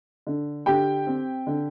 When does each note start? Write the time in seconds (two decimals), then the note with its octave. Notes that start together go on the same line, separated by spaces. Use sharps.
0.27 D3
0.66 D3 G4 G5
1.07 C4
1.47 D3